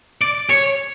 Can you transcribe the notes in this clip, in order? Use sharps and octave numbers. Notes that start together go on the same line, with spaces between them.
D5
C#5